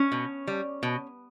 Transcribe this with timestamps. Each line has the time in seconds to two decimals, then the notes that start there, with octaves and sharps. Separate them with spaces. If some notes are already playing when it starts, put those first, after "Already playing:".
Already playing: C#4
0.12 B2
0.48 G3
0.83 B2